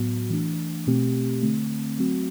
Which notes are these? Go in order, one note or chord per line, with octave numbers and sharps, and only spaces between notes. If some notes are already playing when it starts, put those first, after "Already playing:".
Already playing: A2 F#3 B3 F#4
E3 A3 D4
B2 A3 C4 G4
D3 A3 C4
F#3 A3 C4 F#4